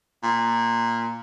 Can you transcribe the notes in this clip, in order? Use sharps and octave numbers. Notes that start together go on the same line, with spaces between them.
A#2